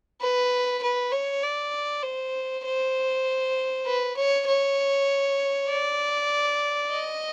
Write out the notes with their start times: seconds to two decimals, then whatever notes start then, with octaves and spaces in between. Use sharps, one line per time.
0.21 B4
0.83 B4
1.12 C#5
1.43 D5
2.04 C5
2.65 C5
3.86 B4
4.17 C#5
4.47 C#5
5.69 D5
6.90 D#5